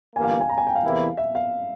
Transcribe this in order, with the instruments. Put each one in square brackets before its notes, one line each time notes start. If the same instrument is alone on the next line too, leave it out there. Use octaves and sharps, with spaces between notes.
[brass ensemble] G1 G2 E3 A#3 [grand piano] G#5
[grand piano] F5
G#5
A#5
G#5
G5
F5
[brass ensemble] E2 C3 E3 A#3 E4
[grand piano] E5
F5